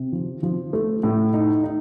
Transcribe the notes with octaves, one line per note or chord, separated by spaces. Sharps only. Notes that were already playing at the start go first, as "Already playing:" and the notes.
Already playing: C3
F3
F3
A3
A2
D#4
D#4